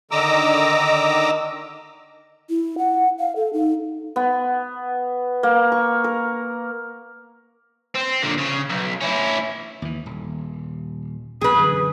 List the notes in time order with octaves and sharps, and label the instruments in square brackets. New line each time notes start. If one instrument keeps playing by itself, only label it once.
[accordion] D3 D#3 D#5 A#5 D6 E6
[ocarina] E4
F#5
F5
A4
D#4
[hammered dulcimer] B3
A#3
C#6
A#4
[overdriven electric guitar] C4
A#2 D3
C#3
B1
C#4 E4
[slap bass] D#2 E3
D#1
[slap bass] A#1 B2 [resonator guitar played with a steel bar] G#4 B4 [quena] D#6
[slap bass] F#2 D3 E3